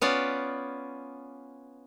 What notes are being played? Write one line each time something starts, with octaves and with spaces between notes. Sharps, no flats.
B3 C#4 F4 D5